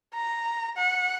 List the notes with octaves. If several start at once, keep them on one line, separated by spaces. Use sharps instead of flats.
A#5
F#5